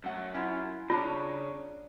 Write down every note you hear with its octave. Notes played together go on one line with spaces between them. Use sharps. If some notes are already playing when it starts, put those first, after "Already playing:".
F#2 A3 F#5
C#4 E4 F4
C#3 G3 D4 F4 A#5